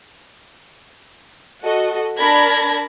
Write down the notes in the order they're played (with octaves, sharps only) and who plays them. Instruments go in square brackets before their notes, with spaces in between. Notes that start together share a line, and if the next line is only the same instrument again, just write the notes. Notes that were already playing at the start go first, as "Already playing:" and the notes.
[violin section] F#4 A4 D#5
D4 A#4 A5 B5 G#6 A#6